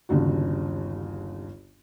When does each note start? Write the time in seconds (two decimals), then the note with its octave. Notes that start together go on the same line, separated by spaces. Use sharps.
0.09 G1 D#2 C#3 D4 F#4